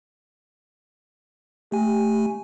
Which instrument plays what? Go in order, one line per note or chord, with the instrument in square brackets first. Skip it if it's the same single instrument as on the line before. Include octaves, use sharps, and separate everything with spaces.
[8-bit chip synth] A3 G#5 [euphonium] G4